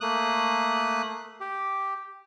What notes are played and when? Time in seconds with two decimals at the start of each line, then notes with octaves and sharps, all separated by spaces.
0.01 A3 A#3 D#6 F#6
1.40 G4